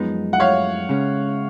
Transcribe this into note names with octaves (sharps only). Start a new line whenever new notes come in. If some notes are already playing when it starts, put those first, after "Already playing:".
Already playing: F#2 F3 G#3 B3 D#4
F#5
C#5 F5
C#3 G#3 C#4